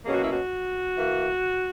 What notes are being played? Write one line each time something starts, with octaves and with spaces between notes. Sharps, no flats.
B2 F#3 A#3 C#4 G#4
F#4
E4
F#4
E3 A#3